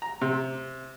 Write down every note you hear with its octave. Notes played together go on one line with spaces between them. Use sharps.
A#5
C3